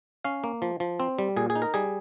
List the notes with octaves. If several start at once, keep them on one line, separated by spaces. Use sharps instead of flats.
C#4 F5
A#3
F3
F3
C4
G3
A#2 G#4
G#4
D#4
A#4
G3 G#4